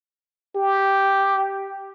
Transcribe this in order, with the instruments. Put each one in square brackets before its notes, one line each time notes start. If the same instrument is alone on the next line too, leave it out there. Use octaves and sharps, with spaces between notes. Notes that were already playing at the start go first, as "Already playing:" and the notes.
[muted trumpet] G4